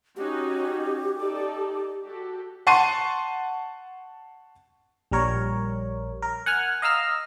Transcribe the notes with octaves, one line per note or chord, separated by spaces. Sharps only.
C#4 D#4 F#4 G4
D#4 A4 D5
F#4 G4 A4
F#5 A5 C6 C#6 C7 D#7
A#1 G3 A#4 C#5
A#4
F#5 G#5 F6
D#5 F5 A#5 E6 F6